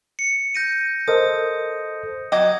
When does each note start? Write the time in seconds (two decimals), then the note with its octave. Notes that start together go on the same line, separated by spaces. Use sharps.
0.19 C#7
0.54 G6 A#6 D#7
1.08 A4 A#4 C5 D#5 D#6
2.32 F#3 D#5 G5 D6 D#6 G#6